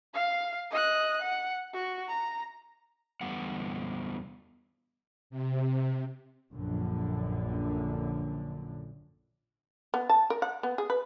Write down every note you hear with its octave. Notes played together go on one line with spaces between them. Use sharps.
F5
D#5 F#6
F#5
F#4
A#5
E2 G3 B3 F#5
C3
A#1 F#2 D3
B3
A5
A#4
F#5
B3
G#4
B4